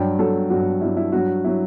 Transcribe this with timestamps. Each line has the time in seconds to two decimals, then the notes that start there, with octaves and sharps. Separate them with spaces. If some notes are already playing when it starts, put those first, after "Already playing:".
Already playing: G2 F#3 G5
0.19 G2 F#3 A4
0.50 G2 F#3 F#4
0.81 G2 F#3 E4
0.97 E4
1.12 G2 F#3 F#4
1.44 F#3 E4